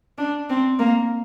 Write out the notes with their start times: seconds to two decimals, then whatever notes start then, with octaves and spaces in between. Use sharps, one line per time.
0.18 D4
0.50 C4
0.79 A#3